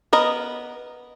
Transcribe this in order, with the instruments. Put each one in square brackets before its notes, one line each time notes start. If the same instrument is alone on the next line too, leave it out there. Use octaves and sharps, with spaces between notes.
[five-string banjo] B3 A#4 D#5